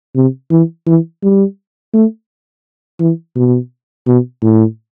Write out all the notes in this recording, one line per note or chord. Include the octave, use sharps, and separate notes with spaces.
C3
E3
E3
G3
A3
E3
B2
B2
A2